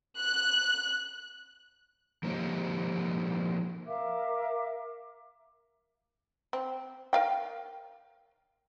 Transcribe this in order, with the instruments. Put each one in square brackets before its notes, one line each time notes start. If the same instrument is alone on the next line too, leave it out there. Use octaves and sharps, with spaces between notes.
[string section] F#6
[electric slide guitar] F3 A#3 C4 D#4 G4 C#5
[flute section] A#4 E5 F5 D6
[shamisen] C4
A#4 F5 G5